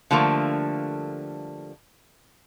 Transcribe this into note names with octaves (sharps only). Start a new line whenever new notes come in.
D3 F3 G3 A3 A#3